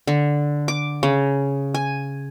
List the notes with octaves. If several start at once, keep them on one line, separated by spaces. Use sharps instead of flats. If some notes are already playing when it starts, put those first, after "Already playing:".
D3
D6
C#3
G#5